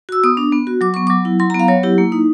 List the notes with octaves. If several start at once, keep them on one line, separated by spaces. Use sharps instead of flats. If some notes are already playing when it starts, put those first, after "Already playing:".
F#4 E6
B3 D#6
D4
B3
F#4
F#3 D6
B3 C#6
F#3 D6
E4
F#3 C6
A#5
B3
F5
F#3 C#5
E4 G4
A#3
D#4